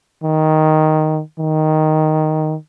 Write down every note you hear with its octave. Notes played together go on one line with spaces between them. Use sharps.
D#3
D#3